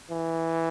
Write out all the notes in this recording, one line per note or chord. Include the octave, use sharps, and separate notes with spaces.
E3